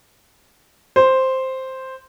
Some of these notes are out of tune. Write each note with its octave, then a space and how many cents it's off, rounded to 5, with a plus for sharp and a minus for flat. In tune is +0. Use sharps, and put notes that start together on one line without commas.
C5 +0